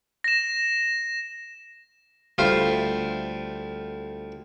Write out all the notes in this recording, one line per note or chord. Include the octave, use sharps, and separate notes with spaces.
A#6 E7
D2 G3 F4 C5 E5 F5